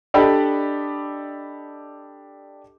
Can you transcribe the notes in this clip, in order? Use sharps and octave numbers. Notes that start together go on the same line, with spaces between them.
D4 G4 A4 D5 D#5 B5